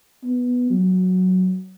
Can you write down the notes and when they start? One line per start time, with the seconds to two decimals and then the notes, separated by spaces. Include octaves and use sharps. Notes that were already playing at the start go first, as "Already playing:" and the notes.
0.23 B3
0.70 F#3